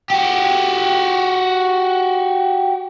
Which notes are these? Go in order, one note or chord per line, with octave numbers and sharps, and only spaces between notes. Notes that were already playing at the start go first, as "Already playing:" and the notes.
F#4 G4